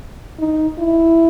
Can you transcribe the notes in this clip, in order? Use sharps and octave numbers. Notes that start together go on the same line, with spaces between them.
D#4
E4